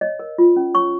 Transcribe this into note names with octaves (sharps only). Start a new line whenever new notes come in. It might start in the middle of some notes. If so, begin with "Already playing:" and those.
C#5 D#5
A#4
F4
C#4
C#5 C#6